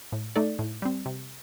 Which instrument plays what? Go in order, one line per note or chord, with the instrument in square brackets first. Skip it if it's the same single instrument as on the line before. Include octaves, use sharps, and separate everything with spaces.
[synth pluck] A2
A3 D#4 A4 D5
A2
G3 C4
C3